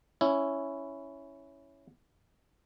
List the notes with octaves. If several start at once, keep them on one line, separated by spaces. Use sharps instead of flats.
C#4 E4